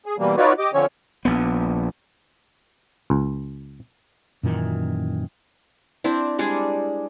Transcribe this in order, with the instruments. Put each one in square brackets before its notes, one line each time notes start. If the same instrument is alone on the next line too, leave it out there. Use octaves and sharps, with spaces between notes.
[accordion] G#4
B2 E3 G3 A#3
D#4 F4 F#4 B4 C#5 D5
G4 D#5 D6
D3 F3 C4 C#4 C#5
[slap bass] A#1 B3
[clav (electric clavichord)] C#2
[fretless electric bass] F#2 A#2 D#3 E3
[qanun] C4 D4 E4
G3 G#3 D4 G#4